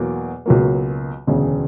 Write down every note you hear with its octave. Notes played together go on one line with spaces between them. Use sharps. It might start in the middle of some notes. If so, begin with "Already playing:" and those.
Already playing: E2 B2 F#3 A#3
C#2 B2 F#3 A#3
E1 D2 C#3